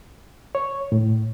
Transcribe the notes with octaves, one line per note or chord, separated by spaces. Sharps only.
C#5
A2